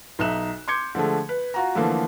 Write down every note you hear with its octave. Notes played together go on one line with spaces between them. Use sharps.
B1 D#4 E5 F#6 E7
C6 D6 G6 G#6 C#7
D3 F3 G#3 A3
B4
F4 F#4 A#5
D3 E3 F3 A3 A#3